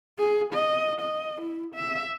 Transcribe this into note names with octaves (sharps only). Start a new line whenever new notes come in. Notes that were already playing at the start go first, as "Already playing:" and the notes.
G#4
D#5
D#5
E4
E5